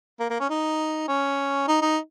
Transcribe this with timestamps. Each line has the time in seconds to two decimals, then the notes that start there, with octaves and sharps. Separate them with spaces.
0.20 A#3
0.30 A#3
0.40 C#4
0.50 D#4
1.08 C#4
1.68 D#4
1.82 D#4